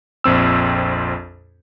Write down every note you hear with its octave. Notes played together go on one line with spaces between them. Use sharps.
A#1 F2 C4 E6